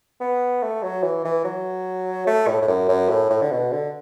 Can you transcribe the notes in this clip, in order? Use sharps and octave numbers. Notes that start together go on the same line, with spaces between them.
B3
A3
F#3
E3
E3
F#3
A3
A2
A2
F#2
F#2
A2
A2
D3
B2
D3